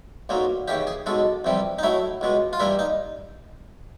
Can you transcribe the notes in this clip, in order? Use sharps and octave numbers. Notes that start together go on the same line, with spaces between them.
B1 A#2 F#3 A#3
D#2 C#3 E3 G4
G#4
B1 B2 G#3 A4
F2 C3 E3 G3
D#4
A2 F#3 A3 E4
C#2 B2 G#3
F4
G2 E3 G3 A#3 E4
D#4